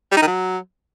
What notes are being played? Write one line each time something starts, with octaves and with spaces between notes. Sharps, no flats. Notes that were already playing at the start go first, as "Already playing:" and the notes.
G3
D#4
D#3
F#3